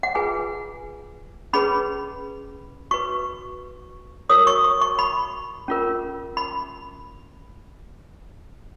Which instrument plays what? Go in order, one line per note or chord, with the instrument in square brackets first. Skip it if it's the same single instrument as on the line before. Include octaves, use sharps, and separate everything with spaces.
[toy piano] F#5
F4 G#4 B4 G#5
C#4 G#4 B4 B5
F#4 B4 C#6
F#4 A#4 C#5 D#6
C#6
C#6
C#6
B5
C#4 F4 A#4
B5